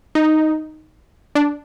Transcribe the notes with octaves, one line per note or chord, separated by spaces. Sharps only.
D#4
D4